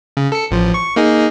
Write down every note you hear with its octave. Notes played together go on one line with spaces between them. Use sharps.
C#3
A4 C#7
A1 F3
C#6
A#3 D#4 G#4